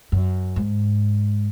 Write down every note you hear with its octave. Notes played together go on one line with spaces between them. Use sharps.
F#2
G#2